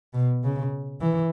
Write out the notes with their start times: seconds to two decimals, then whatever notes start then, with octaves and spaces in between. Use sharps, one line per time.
0.14 B2
0.44 C#3
1.01 E3